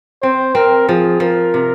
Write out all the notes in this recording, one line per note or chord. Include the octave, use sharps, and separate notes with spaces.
C4 C5
C4 A#4
F3 G#4
F3 A#4
C3